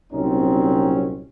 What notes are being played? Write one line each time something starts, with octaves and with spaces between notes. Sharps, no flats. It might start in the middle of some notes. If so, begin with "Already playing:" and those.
C2 A#2 F#3 C4 C#4 D#4